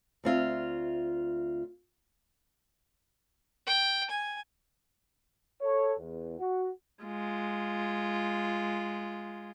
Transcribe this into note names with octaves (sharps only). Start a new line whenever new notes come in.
D2 C4 F4 E5
G5
G#5
A4 C#5
E2
F#4
G#3 F4